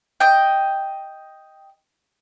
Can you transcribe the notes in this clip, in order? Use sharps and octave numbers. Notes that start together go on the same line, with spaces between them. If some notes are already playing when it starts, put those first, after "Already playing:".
D#5 G5